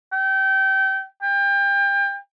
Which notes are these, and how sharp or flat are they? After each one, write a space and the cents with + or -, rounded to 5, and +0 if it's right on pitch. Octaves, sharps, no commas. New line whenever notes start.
G5 -30
G5 +30